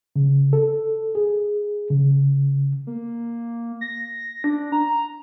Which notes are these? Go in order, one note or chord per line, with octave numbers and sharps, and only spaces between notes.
C#3
A4
G#4
C#3
A#3
A#6
D4
A#5